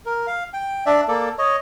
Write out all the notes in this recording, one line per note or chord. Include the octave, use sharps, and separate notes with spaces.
A#4
F5
G5
D4 D5 E5
A#3 A4 D5
C#5 D#5